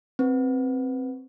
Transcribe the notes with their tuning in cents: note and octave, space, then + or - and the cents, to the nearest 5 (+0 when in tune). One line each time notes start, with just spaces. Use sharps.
C4 +0 B4 +0